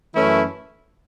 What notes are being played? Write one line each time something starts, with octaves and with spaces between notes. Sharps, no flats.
F#2 E3 A3 C#4 E4